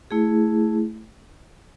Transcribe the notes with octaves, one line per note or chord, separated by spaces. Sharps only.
A3 E4 G#4